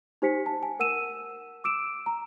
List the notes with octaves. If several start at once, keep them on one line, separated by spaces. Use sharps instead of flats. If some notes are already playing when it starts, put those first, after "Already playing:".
D#4 G4 C5 G#5 B6 C#7
A5
G#5
A#4 F#5 E6 D#7 E7
D6 E6 D7 E7
A#5